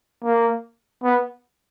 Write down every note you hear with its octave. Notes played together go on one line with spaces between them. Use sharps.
A#3
B3